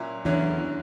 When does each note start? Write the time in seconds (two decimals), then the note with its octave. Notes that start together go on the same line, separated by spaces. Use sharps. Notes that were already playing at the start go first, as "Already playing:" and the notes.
Already playing: A#2 F#3 C#4 E4
0.25 E2 D3 E3 F#3 C#4 E4